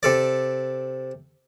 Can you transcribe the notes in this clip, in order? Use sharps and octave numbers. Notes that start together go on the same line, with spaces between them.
C3 A4 D5